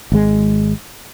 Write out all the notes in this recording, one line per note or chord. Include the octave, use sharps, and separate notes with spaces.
G#1 G#3